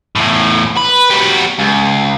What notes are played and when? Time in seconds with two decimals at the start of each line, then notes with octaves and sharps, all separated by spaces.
0.15 E2 A2
0.77 B4
1.10 G3 F#4
1.59 C#2